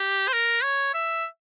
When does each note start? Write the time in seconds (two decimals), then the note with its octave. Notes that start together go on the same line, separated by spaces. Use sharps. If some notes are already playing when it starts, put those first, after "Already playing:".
Already playing: G4
0.28 C5
0.33 A#4
0.63 C#5
0.94 E5